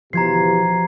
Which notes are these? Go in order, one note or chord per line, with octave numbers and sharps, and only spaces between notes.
B2 E3 F3 G4 A#5 G#6 C7